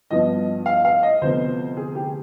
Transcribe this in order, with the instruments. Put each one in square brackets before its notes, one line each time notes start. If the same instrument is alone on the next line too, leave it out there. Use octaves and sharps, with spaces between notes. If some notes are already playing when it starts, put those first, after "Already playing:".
[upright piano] G2 F3 B3 D#5
F5
F5
D#5
D2 C3 F3 B3 C5
G#4
G4